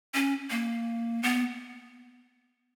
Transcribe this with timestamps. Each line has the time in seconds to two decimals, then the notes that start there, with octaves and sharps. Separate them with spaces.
0.14 C#4
0.50 A#3
1.23 B3